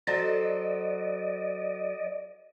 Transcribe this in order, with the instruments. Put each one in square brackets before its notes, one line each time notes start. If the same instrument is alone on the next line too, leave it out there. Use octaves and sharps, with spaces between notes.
[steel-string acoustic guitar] F#3 A4 C5 [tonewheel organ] D5 D#5